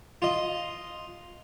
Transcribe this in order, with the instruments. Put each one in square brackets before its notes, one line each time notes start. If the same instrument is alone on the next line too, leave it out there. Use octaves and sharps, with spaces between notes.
[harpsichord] F4 D#5